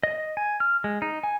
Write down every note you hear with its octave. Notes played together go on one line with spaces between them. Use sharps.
D#5
G#5
F6
G#3
D#4
G#5